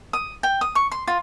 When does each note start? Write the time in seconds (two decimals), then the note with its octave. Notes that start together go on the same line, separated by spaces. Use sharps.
0.13 D#6
0.43 G5
0.61 D#6
0.75 C#6
0.91 C6
1.07 F4